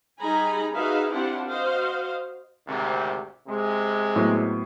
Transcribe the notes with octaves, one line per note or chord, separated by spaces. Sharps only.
G3 D#4 G#4 G#5 A#5 B5
D#4 F#4 G#4 B4 E5 F5
C4 D4 E4 F4 G4 F#5
F#4 C5 D#5 F5
G#1 D2 C3
C3 G#3
A2 F#3 B3